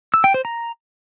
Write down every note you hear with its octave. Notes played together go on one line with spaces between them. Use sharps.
E6
G5
C5
A#5